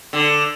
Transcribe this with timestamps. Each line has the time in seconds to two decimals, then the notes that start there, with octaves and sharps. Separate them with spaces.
0.13 D3